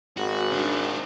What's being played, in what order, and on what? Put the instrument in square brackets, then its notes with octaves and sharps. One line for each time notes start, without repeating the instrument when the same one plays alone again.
[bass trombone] G#1 [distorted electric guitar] F#4
[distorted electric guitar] D4 D#4